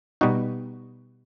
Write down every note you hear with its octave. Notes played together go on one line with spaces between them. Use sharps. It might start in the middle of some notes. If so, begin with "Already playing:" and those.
B2 G3 B3 D#4 F#4